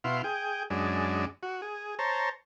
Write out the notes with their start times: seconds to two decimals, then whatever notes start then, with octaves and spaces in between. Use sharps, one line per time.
0.04 B2 E4 F5 C6
0.24 G#4 G5
0.70 F#2 G#3 D4
1.43 F#4
1.62 G#4
1.99 C5 C#5 A5 A#5